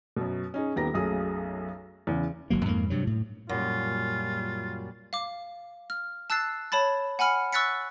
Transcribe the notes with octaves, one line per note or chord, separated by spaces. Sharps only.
F#2 B2
C#4 D#4 G#4
D#1 D#3 B3 G4 A#5 A#6
B1 F#2 A3 G#4 D#6
E2 C#3
G1 F#3 A#3
F2 G#2 A3 A#3
G2 C3 F#3
A2
F#2 A#2 G3 F4
F5 D6
F6
A5 E6 F#6 A6 C7
C#5 A5 B5 A6
F#5 G#5 B5 F6 C#7
C#6 E6 F#6 A6 B6 C#7